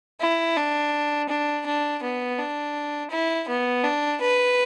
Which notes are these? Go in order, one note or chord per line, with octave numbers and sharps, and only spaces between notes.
E4
D4
D4
D4
B3
D4
E4
B3
D4
B4